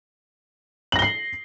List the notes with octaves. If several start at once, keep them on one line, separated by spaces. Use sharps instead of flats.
A#6 C7 F#7 G7